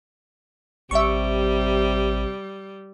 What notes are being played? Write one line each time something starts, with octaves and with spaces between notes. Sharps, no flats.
A1 C3 G3 E5 C#6